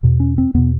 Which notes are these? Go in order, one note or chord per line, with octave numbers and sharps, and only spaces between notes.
E2 B2
C#4
C4
E2 B2 B3